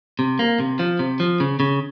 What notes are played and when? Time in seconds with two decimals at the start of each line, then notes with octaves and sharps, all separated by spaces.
0.19 C3
0.39 A#3
0.60 C3
0.79 F3
0.99 C3
1.20 F3
1.40 C#3
1.60 C#3